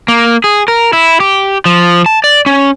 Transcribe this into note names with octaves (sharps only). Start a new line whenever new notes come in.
A#3
G#4
A#4
E4
G4
F3
A5
D5
C#4